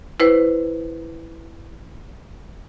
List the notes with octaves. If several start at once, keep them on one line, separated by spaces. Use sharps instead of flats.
E4 B4 C5